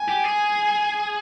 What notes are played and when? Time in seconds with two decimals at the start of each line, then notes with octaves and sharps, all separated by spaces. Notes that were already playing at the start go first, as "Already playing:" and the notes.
Already playing: G#5
0.08 G4
0.24 G#4